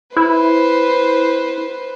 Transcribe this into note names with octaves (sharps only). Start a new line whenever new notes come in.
E4 B4 C5